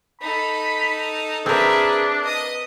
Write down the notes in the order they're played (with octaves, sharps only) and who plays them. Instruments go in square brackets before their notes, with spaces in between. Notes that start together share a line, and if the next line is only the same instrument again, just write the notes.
[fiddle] D#4 A4 [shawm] B5
[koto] C4 A#4 [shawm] D4 [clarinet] G#4 [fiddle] B4 E5
[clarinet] B4 [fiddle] D#5 D#6